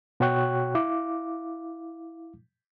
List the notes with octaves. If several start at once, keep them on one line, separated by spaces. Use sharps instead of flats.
B2 F#4 C#5 G5 C#6 F#6
E4 F5 D6